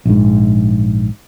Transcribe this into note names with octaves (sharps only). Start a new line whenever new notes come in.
A#1 G#2